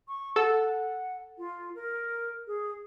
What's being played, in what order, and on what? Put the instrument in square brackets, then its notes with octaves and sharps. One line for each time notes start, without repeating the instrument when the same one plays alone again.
[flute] C#6
[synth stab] A4 [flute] F#5
[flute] F4
A#4
G#4